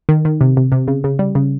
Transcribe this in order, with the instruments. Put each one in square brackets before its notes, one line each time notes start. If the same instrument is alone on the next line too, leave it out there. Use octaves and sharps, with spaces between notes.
[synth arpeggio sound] D#3
D#3
C3
C3
C3
C#3
C#3
G3
C#3